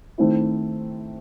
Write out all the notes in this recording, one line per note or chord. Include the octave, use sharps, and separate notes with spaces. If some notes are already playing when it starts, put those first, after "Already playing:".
D#3 A3 C4 E4